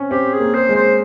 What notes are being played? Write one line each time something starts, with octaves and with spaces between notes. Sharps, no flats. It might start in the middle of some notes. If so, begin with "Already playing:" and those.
Already playing: C4 C#4
C4 G4
G#4
A#3
C5
G#3
C5